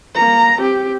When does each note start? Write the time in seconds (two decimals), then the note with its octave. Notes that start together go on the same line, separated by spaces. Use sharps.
0.15 A#3 A#5
0.58 C4 G4